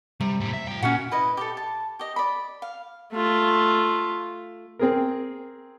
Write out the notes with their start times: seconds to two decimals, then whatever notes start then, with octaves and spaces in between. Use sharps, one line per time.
0.21 C3 G3
0.41 A2 G3
0.53 E5
0.68 F4 G5
0.82 A#2 C#4 F#4 F#5
1.11 E4 B4 D#5
1.37 G4 A4
1.57 A5
1.99 G4 D#5
2.16 D5 B5
2.62 F5
3.13 A3 F4
4.79 C4 G#4 A#4